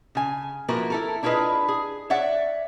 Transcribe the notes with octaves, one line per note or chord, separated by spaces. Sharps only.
C#3 G#5
F3 A#3 E4 F#4 A#4 B4
E4 A4 A#4
D4 E4 F4 G#4 B4 D#5
G#4
C#5 D5 E5 F#5